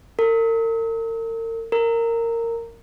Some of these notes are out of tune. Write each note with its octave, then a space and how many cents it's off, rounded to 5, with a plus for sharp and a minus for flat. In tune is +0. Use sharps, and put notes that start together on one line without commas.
A#4 -40
A#4 -15